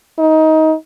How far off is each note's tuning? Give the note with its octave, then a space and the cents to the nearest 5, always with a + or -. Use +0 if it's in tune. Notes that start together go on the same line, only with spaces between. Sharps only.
D#4 +20